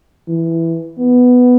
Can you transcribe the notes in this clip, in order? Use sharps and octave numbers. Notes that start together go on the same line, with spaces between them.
E3
B3